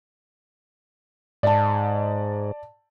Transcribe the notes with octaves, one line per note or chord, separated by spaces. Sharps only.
G#2 D5 A5